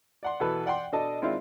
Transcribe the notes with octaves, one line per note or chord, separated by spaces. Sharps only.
D5 F#5 C6
B2 E3 A4 B4
D5 F#5 G5 C6
B2 D4 A4 D#5 A5
D#3 G#3 C4 D4 E4 F4